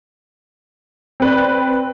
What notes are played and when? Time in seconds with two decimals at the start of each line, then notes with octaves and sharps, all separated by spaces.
1.20 C4 B4 D5